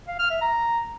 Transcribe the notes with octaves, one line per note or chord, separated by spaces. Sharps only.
F5
F6
E5
A#5